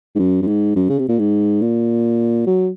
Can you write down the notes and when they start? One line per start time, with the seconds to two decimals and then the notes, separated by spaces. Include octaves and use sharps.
0.15 G#2
0.19 F#2
0.42 F#2
0.47 G#2
0.76 F#2
0.89 C#3
0.99 C3
1.09 A#2
1.19 G#2
1.61 A#2
2.46 F#3